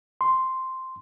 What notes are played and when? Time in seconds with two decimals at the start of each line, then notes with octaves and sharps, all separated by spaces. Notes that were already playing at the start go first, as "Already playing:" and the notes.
0.21 C6